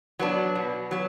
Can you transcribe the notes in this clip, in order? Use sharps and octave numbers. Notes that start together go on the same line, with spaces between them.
F#3 B3 D4
B2
F#3 B3